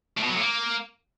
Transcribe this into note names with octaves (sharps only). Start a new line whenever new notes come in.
A2
B2
F#3
A2
A#3